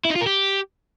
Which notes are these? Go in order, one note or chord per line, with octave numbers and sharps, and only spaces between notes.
E4
D#4
F4
A#4
G4